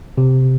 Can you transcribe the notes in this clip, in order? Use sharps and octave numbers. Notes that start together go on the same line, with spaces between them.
C3